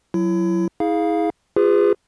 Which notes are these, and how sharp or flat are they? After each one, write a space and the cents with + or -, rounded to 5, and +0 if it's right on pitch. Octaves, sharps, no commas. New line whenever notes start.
F#3 +0 E4 +30
E4 -35 G#4 +0 F5 +0
F4 +0 G#4 -30 B4 +30